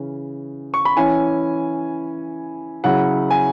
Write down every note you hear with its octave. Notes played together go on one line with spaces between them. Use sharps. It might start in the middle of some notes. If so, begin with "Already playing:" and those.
Already playing: C#3 E3 C#4
C#6
B5
E3 C#4 E4 G#5
C#3 F#3 E4 F#5
G#5